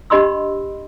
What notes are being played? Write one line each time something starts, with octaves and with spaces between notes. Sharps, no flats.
D4 G4 D#5 B5 C6 E6